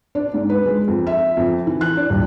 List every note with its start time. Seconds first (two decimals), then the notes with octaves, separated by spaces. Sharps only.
0.15 D4
0.34 G#2
0.50 B4
0.66 G#3
0.88 F2
1.07 E5
1.37 F2
1.67 E3
1.81 F#6
1.97 D4
2.10 D#1